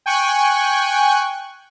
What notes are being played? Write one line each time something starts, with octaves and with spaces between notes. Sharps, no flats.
G5 G#5 C#6 F#6